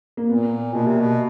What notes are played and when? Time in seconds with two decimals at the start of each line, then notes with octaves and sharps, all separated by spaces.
0.17 A#3
0.29 A#2 B3
0.74 B2 A#3
0.87 C3
1.00 B2